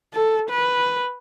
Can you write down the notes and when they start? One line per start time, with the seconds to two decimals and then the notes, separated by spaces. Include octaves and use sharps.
0.13 A4
0.50 B4